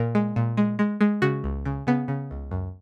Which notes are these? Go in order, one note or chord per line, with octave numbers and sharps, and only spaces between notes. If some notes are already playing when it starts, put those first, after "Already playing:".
Already playing: A#2 A#4
G#3
A#2
G#3
G#3
G#3
C#3 F#4
C#2
C#3
C#3 B3
C#3
C#2
F#2